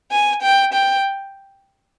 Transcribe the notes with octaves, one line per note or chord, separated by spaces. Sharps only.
G#5
G5
G5